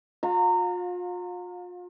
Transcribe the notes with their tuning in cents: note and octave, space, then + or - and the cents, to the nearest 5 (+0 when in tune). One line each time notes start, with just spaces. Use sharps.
F4 +40 F5 +30 A#5 -25